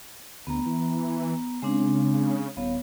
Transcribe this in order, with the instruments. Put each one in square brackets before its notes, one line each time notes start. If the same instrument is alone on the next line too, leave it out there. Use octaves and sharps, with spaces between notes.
[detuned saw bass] D2 [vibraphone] B3 A#5
[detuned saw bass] E3
[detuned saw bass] C#3 [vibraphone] G#3 C4 D4
[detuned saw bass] D#1 [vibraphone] B3 C#5 F5